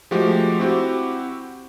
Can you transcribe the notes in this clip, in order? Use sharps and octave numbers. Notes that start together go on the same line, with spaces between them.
F3 G#3 A3 F#4 G4
C4 E4 F#4 G4